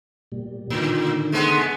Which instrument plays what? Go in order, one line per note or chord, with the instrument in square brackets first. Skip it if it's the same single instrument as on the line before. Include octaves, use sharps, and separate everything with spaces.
[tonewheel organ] A#2 G3
[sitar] A2 [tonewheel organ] D3 D#3
[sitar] G#3 A3 B3